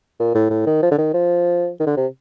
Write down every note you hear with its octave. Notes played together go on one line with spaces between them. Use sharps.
A#2
A2
A2
D#3
F3
D3
D#3
F3
D#3
D3
C3